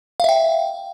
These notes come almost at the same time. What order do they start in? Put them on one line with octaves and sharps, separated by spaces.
F5 E5 G5